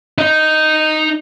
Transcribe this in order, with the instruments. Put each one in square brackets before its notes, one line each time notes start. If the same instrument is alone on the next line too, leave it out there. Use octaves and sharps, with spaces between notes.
[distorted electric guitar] D#4 D#5